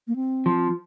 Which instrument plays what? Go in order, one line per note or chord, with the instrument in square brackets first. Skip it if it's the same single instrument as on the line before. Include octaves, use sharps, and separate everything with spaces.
[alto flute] A#3
C4
[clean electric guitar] F3